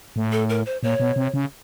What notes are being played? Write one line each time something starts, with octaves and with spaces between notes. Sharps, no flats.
A2
A4
A#4
C5
A#2 C#5
B2
C3
C#3